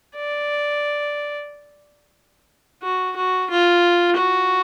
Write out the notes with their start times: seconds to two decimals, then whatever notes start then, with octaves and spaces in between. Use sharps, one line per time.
0.16 D5
2.83 F#4
3.16 F#4
3.50 F4
4.17 F#4